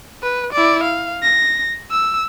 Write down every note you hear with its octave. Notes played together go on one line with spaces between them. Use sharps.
B4
E4 D5
F5
A#6
E6